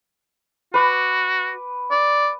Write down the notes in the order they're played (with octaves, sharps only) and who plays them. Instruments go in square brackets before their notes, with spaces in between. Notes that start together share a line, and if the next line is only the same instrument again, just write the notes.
[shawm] F#4 [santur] B4 D6
[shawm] D5